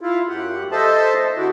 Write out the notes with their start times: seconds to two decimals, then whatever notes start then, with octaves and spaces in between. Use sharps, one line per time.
0.01 E4 F4
0.29 F#2 G4 F#5
0.72 A4 C5 D#5 E5 A5
1.37 D3 E4 F#4 G4